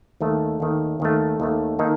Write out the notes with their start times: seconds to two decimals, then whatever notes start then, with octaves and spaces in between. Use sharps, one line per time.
0.20 D#2 D#3 A3
0.60 D#2 D#3 A3
1.00 D#2 D#3 A3
1.40 D#2 D#3 A3
1.79 D#3 A#3 D#4 A4